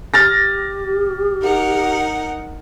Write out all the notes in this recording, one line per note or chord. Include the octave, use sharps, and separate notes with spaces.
G4 F6 A6 A#6
D#4 A#4 F#5